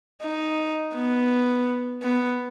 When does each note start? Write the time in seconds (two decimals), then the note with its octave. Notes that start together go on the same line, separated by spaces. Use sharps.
0.22 D#4
0.95 B3
2.03 B3